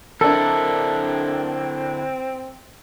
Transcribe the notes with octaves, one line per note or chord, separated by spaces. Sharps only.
D3 C4 D4 E4 A4 A#4